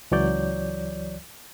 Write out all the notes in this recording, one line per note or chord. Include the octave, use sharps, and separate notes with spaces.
C#2 E3 F#3 C#5 D5 G6